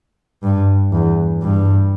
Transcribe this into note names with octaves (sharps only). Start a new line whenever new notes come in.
G2
E2
G2